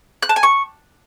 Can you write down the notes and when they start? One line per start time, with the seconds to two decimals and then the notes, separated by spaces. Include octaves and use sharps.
0.22 F#6
0.29 A5
0.36 G#5
0.43 C#6